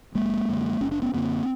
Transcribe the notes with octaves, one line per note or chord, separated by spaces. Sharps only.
F#1 G#3 A#3
F#2 D3
F#1 C#4
D4
B3 C#4
F#2 D3 A#3 C4